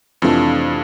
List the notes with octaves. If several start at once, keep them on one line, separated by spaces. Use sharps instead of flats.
F2 C3 E3 A3 D4 F4